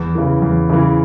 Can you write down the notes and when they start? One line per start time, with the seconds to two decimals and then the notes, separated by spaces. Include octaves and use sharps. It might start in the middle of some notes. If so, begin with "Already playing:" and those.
Already playing: E2
0.15 C#3 E3
0.42 E2
0.70 C#3 E3